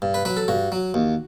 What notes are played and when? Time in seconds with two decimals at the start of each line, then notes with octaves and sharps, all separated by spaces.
0.02 G2
0.14 B4
0.25 F#3 B4
0.37 A4
0.48 G2 F#4
0.72 F#3
0.94 D#2